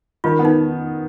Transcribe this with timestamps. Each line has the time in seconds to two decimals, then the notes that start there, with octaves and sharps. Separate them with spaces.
0.24 D#3 F4
0.39 B3
0.45 D#4